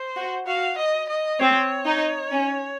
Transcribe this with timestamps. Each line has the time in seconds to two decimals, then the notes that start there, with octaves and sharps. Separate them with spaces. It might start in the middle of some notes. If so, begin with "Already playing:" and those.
Already playing: C5
0.16 F#4
0.46 F#4 F5
0.78 D#5
1.09 D#5
1.40 C4 C#5
1.86 D#4
2.33 C#4